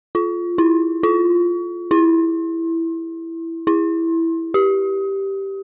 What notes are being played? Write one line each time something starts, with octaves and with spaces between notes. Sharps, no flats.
F4
E4
F4
E4
E4
G4